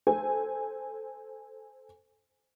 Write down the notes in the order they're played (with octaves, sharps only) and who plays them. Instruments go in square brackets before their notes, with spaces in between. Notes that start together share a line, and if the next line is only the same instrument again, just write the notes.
[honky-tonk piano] A4 C5 G#5